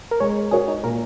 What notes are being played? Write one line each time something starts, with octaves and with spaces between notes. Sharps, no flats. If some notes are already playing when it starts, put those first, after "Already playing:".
A#4
G#3 C#5
F#4 G#4 A#4 C#5
D#4
A#2 A#4